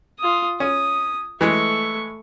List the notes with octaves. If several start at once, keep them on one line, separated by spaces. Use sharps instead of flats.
F4 D#6
C#4 D#6
E3 G#3 A3 C#6